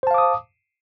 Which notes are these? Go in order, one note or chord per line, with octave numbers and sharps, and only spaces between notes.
C5 F5 A5 D6 D#6